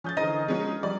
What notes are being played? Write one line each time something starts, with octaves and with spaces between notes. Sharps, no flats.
F3 C#4 G#4 G6 A6
D3 E3 D#4 G#4 A#4 C5 D#5
F3 G#3 C#4 F#4
F3 G3 D5